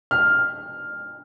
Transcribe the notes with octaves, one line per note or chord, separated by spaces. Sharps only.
F6